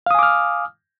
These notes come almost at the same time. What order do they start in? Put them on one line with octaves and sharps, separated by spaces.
F5 D#6 G#5 D6 F6